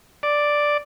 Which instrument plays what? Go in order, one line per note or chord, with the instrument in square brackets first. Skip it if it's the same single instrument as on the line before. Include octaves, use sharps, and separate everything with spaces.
[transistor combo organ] D5